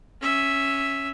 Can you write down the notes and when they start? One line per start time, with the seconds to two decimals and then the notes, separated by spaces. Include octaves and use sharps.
0.21 C#4 E5